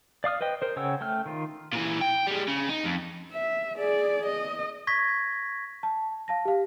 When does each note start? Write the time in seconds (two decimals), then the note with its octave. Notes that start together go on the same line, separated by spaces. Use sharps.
0.24 D5 F5 D#6 F6
0.41 B4 C5 D#5 G5
0.62 A#4 C5
0.76 C#3 C#5 F#5 G5 E6
1.01 A3 G5 F6
1.26 D#3 F4
1.73 A#2 E3
2.01 G5
2.27 G3 G#3
2.48 C#3
2.69 D#4
2.84 F2
3.32 E5
3.77 G#4 D5
4.26 D#5
4.87 C#6 G#6 A#6 B6
5.83 A5
6.28 F5 A5 A#6
6.45 G4 F5